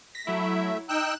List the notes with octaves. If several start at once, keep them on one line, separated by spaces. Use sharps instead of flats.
A#6 B6
F#3 A3 E4 E5
D#4 G5 E6 F#6 E7